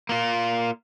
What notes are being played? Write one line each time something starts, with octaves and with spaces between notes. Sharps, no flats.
A#3 F4